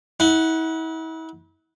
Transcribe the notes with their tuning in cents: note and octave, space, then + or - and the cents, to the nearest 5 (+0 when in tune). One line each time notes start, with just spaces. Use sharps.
E4 -40 F#5 +0